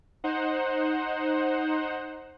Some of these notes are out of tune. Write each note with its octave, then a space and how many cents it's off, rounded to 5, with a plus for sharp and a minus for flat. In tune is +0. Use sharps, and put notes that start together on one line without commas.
D#4 +0 C5 +15 F#5 +0